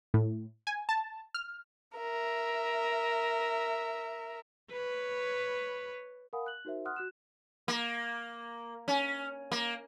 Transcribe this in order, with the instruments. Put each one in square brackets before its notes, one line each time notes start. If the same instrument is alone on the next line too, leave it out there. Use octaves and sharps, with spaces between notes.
[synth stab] A2
G#5
A5
F6
[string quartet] A#4 E5
[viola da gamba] B4 C#5
[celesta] A#4 F5 F#5 G#5 B5 D#6
F#6 F#7
D#4 F#4 A#4 C5 E5
F#5 C6 D#6 F6 F#6
F#4 F#6 E7
[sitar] A#3
C#4
A#3